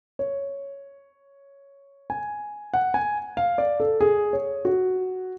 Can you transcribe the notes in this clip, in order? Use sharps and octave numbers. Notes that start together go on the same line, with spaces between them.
C#5
G#5
F#5
G#5
F5
D5
A4
G#4
C#5
F#4